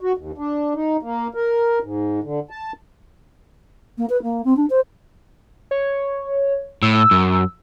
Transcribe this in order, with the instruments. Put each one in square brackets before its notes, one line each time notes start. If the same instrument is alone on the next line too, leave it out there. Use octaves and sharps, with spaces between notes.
[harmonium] F#4
D#2
D4
D#4
A#3
A#4
G#2
D3
A5
[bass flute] A#3
B4
A#3
C4
D4
C5
[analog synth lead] C#5
[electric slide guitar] A2 [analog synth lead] E6
[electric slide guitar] F#2